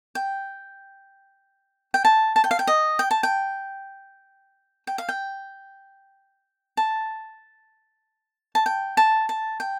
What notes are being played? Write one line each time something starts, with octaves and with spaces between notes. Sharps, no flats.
G5
G5
A5
A5
G5
F5
G5
D#5
G5
A5
G5
G5
F5
G5
A5
A5
G5
A5
A5
G5